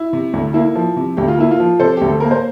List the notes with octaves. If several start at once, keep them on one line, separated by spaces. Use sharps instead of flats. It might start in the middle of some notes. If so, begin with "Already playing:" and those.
Already playing: E4
C3
D2
A#3 E4
F3
C3
D2 G4
F4
A#3 E4
F4
F3
C3 A4 C5
D2 G4
A4
A#3 A#4
C5